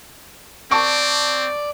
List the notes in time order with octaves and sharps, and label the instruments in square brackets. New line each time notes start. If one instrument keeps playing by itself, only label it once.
[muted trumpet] C4 [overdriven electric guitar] D5 [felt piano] A5 C#6